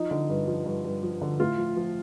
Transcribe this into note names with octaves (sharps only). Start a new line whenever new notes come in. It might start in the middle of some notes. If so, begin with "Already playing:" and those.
Already playing: F3 D#4
D3
G2
F3
G2
G2
F3
D3
A2 F4
F3
F3